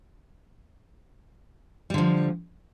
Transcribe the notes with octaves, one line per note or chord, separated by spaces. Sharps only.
D3 F3 G3